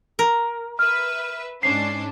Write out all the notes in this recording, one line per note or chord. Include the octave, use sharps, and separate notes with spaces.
A#4
B4 E5 F6
G#2 C#4 D4 C7